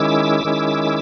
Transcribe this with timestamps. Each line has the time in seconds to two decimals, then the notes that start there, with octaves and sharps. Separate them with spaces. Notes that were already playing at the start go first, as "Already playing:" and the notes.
Already playing: D#3 G#3 C#4 E4 D6 E6
0.45 D#3 G#3 C#4 E4